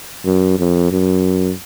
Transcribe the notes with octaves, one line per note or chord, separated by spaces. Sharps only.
F#2
F2
F#2